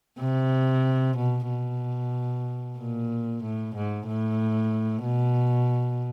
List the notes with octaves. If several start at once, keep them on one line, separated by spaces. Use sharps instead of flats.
C3
B2
B2
A#2
A2
G#2
A2
B2